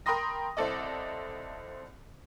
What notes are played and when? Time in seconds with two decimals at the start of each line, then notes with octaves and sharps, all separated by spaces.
0.06 A#4 G5 B5 C6 D#6 A#6
0.57 C2 C4 E4 A4 D5 D#5